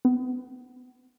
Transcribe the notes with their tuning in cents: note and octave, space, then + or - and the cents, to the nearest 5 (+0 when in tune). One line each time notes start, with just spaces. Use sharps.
B3 +35